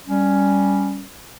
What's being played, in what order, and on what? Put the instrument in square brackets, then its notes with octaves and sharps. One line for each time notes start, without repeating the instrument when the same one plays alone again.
[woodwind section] G3 C#4